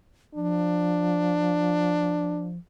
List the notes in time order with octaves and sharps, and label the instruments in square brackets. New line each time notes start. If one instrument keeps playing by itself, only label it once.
[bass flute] F3 [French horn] D4